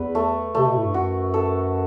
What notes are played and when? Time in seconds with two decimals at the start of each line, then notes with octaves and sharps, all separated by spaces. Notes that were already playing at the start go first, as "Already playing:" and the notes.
Already playing: E2 B4
0.15 A3
0.55 C3 A3
0.66 B2
0.75 A2
0.85 G2
0.94 F#2 F#4
1.34 A4